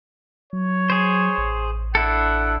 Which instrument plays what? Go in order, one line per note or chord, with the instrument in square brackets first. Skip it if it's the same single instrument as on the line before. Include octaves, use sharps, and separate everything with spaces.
[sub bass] F#3 [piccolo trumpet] C#5
[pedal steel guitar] G#4 C5
[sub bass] A1
[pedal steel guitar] D4 E4 A4 [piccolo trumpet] F#5